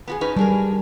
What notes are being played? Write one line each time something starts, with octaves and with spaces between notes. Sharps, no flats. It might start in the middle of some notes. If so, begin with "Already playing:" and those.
B3 F#4 G#4
C#4 D#4 B4
G3 D4 G#4 A#4